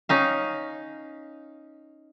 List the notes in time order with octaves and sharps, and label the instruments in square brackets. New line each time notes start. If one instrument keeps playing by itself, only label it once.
[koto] C#4 D#4 F5